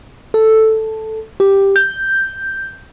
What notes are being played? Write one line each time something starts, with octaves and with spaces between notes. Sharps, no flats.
A4
G4
G6